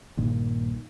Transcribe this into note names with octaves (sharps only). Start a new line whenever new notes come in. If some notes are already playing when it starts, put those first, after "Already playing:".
A#1 G2 A#2 D#3